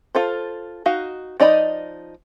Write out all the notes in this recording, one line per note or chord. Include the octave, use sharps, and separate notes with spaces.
F4 A4 C5
D#4 F#4 F5
F3 D#4 D5 D#5 B5